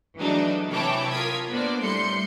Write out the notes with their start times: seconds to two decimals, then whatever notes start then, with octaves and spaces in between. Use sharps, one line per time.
0.17 E3 F#3 G#3 A3 D4 D#4
0.69 C3 E3 C#5 G5 A5 D6
1.10 F4 A#4 D#6 G#6 B6
1.50 A#3 B3 D4 C5 D5
1.81 A2 G3 C6 G6 C#7